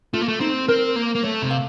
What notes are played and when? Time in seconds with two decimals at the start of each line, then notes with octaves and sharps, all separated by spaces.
0.13 A3 F4
0.21 A#3
0.28 A3
0.40 C4 D#4
0.68 C4 A#4
0.96 A#3
1.15 A#3
1.23 A3 C#5
1.42 C3
1.51 F5